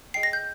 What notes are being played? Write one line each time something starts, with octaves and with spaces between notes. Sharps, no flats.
G#4 D#5 G5 C7
A#6
G6